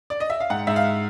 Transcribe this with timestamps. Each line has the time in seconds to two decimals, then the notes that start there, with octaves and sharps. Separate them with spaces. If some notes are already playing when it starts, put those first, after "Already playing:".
0.10 D5
0.20 D#5
0.30 E5
0.40 F5
0.50 G#2 F#5
0.67 G#2 E5
0.76 F5